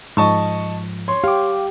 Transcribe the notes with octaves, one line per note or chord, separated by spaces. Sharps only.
G#2 F3 D#5 A5 C#6
C#5 C6
G4 F5 D6